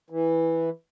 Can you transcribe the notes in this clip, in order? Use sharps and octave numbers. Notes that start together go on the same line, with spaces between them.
E3